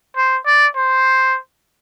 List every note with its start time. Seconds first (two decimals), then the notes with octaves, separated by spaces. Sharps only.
0.16 C5
0.46 D5
0.76 C5